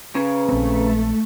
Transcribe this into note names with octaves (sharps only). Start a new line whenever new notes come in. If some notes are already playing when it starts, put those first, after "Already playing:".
C#3 B4 A#5
A#1 A3 C4